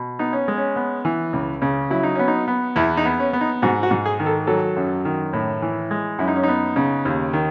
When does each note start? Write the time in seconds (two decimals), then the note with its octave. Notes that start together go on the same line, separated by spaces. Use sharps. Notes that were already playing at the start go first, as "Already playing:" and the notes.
Already playing: B2
0.19 B3 D#4
0.33 C#4
0.48 G#3
0.58 C#4
0.76 B3
1.05 E3
1.33 C#2
1.62 C#3
1.90 F#3 E4
2.03 D#4
2.15 B3 C#4
2.28 D#4
2.48 B3
2.76 E2 E4
2.97 D#4
3.05 B3
3.19 C#4
3.33 B3
3.41 D#4
3.62 G#2 F#4
3.83 F#4
3.91 G#2
4.06 G#4
4.20 D#3
4.26 A4
4.47 F#3 A4
4.77 F#2
5.05 D#3
5.33 A2
5.62 E3
5.91 G#3
6.19 F#2 E4
6.28 D#4
6.36 C#4
6.43 B3 D#4
6.76 C#3
7.05 D#2
7.33 D#3